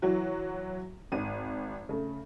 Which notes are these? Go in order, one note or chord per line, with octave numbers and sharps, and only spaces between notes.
E3 F#3 F#4
G#1 D#7
C#3 A3